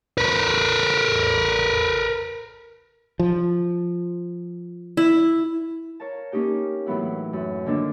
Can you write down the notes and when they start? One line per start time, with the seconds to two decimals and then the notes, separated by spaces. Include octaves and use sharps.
0.18 A#4 B4
3.19 F3
4.97 E4
6.00 A#4 C#5 F5 A5
6.32 A#3 C#4 D#4 G4 G5
6.86 A2 E3 F#3 B3 E4
7.33 F#2
7.66 D3 D#3 A#3 D4 F4